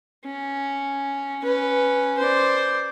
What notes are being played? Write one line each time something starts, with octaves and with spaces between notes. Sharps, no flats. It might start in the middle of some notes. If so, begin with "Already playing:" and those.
C#4
C#4 B4
C5 D5